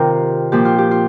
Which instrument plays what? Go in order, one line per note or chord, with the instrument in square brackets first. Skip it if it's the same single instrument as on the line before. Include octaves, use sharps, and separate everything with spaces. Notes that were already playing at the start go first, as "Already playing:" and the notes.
Already playing: [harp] C3 D#3 F4 G4 A#4 C5 F5
A#2 F3 G4
F4
G4
F4